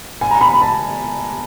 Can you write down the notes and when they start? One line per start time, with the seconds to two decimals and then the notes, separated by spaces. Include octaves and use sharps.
0.21 G#5
0.31 A#5
0.41 B5
0.52 B5
0.61 A5